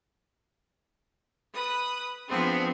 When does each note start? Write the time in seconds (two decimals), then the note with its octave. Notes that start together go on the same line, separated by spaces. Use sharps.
1.53 B4 D#6 F#6
2.28 F3 B3 C4 D4 G#4